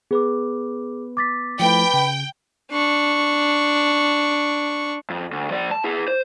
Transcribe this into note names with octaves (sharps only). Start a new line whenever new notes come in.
B3 G#4 B4 D6
D6 A6 B6
F3 A3 E4 B4 G5
C#3
D4 C#6
F2
D2
F3 D5
A5
E4 G#4
C5